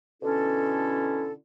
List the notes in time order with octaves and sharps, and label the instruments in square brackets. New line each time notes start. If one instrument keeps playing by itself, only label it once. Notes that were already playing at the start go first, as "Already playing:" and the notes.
[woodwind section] B2 D3 C#4 E4 A4